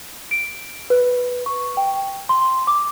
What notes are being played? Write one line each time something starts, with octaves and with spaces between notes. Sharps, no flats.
D7
B4
C#6
G5
C6
D6